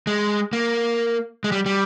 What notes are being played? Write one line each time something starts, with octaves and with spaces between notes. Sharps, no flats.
G#3
A#3
G#3
G3
G3